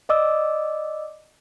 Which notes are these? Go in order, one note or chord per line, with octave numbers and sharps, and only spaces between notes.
D5 D#5 D6 E6